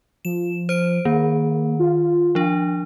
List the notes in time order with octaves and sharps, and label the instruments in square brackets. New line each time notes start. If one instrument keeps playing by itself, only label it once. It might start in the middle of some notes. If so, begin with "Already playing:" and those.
[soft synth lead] F3 [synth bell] E7
[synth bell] C5 D7
[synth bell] D#3 [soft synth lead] A#3
[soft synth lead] F4
[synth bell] F3 D4